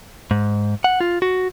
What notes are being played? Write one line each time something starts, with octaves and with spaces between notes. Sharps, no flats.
G#2
F#5
F4
F#4